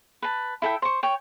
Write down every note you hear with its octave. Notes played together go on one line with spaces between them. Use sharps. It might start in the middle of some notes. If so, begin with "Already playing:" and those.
B4 A5
E4 A4 E5 G5
C5 C#6
C#5 G5